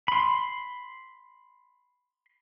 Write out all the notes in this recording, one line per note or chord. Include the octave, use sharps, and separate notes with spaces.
B5 C6